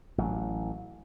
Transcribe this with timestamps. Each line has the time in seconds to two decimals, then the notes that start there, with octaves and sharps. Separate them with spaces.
0.18 A1 F#3